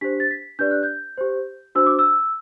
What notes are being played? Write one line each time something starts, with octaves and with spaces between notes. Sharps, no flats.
D4 G4 C5 B6
A6
B6
D4 G4 B4 D5 G6
F#6
G6
G4 C5
D4 F#4 C5 E6
D6
E6